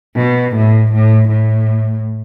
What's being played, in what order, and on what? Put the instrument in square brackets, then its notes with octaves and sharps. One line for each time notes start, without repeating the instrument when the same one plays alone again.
[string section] B2
A2
A2
A2